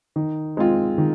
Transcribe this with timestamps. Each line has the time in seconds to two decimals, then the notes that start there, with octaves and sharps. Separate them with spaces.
0.16 D#3
0.57 G#3 C4 F4
0.98 D#3